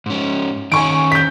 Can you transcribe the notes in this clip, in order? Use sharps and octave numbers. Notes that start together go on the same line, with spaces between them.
G#2 C#4
D#3 C#4 G#5 C#6 D7
G6 B6